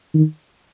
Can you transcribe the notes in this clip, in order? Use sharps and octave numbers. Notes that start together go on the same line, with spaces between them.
D#3